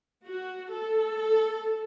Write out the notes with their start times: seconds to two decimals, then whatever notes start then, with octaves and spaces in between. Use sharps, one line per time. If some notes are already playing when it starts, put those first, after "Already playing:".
0.23 F#4
0.68 A4